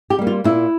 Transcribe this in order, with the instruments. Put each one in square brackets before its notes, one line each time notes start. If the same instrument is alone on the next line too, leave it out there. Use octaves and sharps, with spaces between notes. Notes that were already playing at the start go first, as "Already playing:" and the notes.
[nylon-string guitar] G4
G3 A#3
F4
A#2 E4